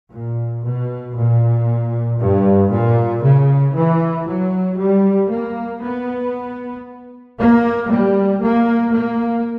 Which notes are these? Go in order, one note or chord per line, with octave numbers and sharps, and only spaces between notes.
A#2
B2
A#2
G2
A#2
C#3
E3
F#3
G3
A#3
B3
A#3
G3
A#3
A#3